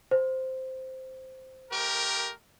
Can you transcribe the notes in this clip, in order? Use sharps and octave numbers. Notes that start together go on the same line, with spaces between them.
C5
A3 G4 A#4